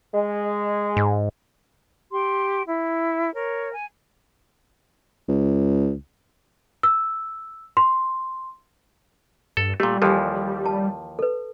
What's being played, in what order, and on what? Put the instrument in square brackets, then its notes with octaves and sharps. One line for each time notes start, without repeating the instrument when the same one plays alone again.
[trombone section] G#3
[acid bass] G#2
[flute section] G4 C6
E4
A#4 C#5
G#5
[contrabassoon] C#2
[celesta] E6
C6
[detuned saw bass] G2 [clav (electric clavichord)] A4
[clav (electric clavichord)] A#2 A3 [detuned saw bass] G3 [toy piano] G4
[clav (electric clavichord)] D#2 E3 F3 [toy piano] A4 G#5
[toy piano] A5
A4 B4